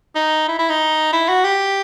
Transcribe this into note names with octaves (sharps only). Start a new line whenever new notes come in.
D#4
E4
E4
D#4
E4
F#4
G4